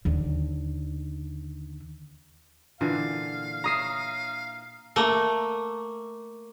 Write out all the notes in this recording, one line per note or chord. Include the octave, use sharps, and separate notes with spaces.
D#2 D3
A#2 D3 E3 F5
C#5 E5 A#5 D#6 C7
A3 A#3